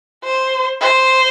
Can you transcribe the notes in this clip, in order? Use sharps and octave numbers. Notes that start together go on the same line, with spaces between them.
C5
C5